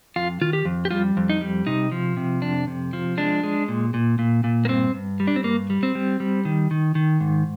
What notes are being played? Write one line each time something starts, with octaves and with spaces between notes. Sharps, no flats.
F2 F4
D#3 F4
G4
F2
G4
G3 F4
F2
D#4
G3
C3 D#4
F3
C3
F2 D4
C3
F3
G#3 D4
G#3
A#2
A#2
A#2
A#2
A#3
G2 C4
G2
G3
D4
C4
G2 A#3
G3
C4
G3
G3
D#3
D#3
D#3
G#2